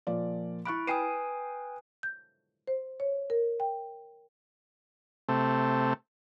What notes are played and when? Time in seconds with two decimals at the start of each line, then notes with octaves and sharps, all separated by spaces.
0.07 A#2 F3 D5
0.65 E4 B5 C#6 F#6 D7
0.87 B4 G5 G#5 D#6 C7 D#7
2.03 G6
2.67 C5
3.00 C#5
3.30 A#4
3.60 G5
5.29 C3 A3